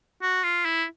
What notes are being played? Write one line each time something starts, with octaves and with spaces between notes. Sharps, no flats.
F#4
F4
E4